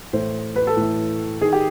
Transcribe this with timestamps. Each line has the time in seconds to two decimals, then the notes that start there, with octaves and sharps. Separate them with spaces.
0.13 A2 E3 C5
0.56 B4
0.67 A4
0.77 A2 E3
1.41 D#3 G#4
1.53 G4